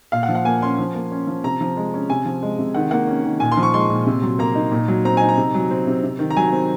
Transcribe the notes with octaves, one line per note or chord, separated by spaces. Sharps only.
A#2 F5
F#5
F3
F#5
A#3 G#5
C#4 C6
F3
A#3
C#4
F3
C3 A#5
F3
G#3
C#4
C3 G#5
F3
G#3
C3
D#3 F#5
A#3 F#5
C#4
D#3
A#2 G#5
C6
F3
C#6
G#3 C6
A#2
C3
F#3
A#3 A#5
D#4
A#2
F#3
C4 A#5
D#4 G#5
A#5
C3
F#3
C4
C3
C3
D#3
A#5
F#3 G#5
C4